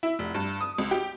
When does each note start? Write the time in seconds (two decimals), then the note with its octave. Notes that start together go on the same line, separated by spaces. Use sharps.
0.03 E4
0.19 F1
0.34 G2
0.61 D#6
0.78 C#2
0.91 G4